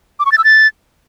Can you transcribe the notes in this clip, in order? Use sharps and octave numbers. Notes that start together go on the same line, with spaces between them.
D6
C#6
A6
E6
A6